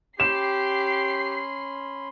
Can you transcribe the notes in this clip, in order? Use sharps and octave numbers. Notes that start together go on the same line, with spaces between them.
C#4 G4 B5 C6 C7 E7